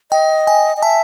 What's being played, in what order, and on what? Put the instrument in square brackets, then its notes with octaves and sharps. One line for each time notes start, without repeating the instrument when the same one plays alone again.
[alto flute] D#5 [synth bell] G5
[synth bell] G#5
[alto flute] D#5
[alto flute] E5 [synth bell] A5